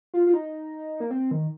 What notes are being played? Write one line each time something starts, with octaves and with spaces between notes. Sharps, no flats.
F4
F4
D#4
A#3
C4
D#3